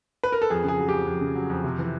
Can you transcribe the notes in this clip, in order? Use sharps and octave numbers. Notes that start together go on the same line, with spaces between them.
B4
A#4
A4
F2 G#4
C#3 G#4
F#3
F2 G4
F2
C#3
F#3
F2
C3
E3